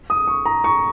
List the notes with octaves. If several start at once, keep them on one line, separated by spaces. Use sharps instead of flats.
D#6
C#6
A#5
C#6